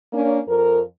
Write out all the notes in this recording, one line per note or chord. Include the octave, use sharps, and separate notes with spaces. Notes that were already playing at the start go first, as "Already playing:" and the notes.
A#3 C#4 D4
F2 A#4